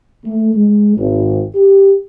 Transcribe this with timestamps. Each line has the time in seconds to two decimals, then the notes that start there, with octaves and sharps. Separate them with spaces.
0.24 A3
0.54 G#3
0.97 G#1
1.55 G4